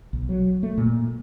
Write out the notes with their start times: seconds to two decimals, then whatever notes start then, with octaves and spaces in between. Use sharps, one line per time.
0.13 B1
0.29 F#3
0.63 A3
0.78 A#2